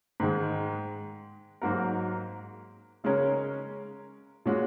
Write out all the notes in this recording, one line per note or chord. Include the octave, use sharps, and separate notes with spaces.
G#2 D#3 G#3
G#2 F#3 A#3 F#4 A#4
C#3 G#3 C#4 A#4 C#5
A#2 G#3 C#4 F#4